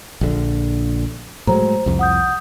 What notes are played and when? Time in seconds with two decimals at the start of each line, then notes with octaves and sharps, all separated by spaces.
0.21 A#1 D3
1.47 A2 F#3 G#3 C5 A#5
1.86 C2 F2
1.99 F#5 D#6 G6